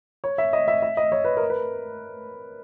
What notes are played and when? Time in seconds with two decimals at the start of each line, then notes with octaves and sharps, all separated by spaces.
0.24 C#5
0.38 E5
0.53 D#5
0.68 E5
0.82 E5
0.97 D#5
1.12 C#5
1.24 B4
1.37 A#4
1.50 B4